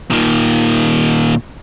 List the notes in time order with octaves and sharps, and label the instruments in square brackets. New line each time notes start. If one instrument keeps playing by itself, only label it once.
[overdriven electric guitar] A#2 D#3